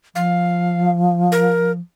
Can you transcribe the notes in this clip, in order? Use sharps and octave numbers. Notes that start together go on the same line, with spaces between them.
F3 F5
A#4